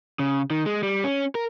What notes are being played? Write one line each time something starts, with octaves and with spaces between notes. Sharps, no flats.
C#3
D#3
G#3
G3
C#4
A#4